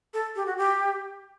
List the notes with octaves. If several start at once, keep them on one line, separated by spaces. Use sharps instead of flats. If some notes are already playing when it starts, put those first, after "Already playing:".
A4
G4
F#4
G4